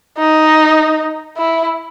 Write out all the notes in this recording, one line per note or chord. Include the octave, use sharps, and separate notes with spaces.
D#4
E4